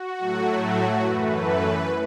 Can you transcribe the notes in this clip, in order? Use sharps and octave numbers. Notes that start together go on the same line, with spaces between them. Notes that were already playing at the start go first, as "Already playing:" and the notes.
Already playing: F#4
A2 F#3 A3
F#4
F#2 E3 A3 B4